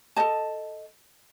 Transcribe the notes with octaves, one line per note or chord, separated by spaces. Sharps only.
A4 D#5 A5